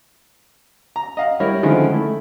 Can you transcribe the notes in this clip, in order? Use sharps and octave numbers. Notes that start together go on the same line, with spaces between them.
A#5
D#5 F5 F#5
G3 E4 A#4 C#5
D3 D#3 F3 G#3 C#4 E4
A3 E4